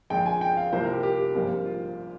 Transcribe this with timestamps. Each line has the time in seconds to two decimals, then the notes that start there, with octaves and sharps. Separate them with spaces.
0.10 A#1 A#2 G#3 G5
0.26 G#5
0.41 G5
0.57 F5
0.72 C2 C3 F3 A#3 C5
0.83 A#4
0.93 G4
1.03 G4
1.35 A#1 G#2 G3 A#3
1.66 F4